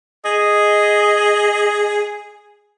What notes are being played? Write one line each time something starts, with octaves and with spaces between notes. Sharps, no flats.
G#4 D#5